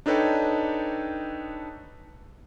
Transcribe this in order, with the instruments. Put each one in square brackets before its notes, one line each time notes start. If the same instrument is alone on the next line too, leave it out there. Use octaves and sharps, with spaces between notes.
[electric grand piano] D4 D#4 A4 B4 C#5 G5